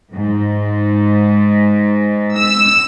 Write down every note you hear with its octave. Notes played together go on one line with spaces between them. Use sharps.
G#2
E6